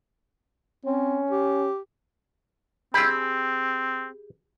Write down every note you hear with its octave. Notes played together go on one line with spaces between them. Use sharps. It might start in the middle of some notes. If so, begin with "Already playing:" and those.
C4 C#4
G4
C4 G4 G#4 B5 E6